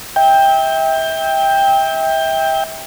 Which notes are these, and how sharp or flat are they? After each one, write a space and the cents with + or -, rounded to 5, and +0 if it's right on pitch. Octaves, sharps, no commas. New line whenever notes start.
E5 -30 G5 +15